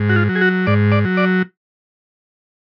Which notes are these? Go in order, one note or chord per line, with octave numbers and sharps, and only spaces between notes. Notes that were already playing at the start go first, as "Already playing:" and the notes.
Already playing: G#2
F#4
F4
F#3
G#4
F#4
G#2 D5
D5
F#3
D5